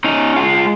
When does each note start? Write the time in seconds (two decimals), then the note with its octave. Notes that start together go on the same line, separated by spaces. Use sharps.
0.04 C#4 D#4
0.36 G#3 F4